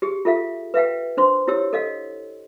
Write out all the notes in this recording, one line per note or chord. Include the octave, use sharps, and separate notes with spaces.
G4 G#4
F4 A4 E5 F5
B4 E5 F5 G5
D4 C5 C6
E4 G4 C#5 E6
A4 D#5 F5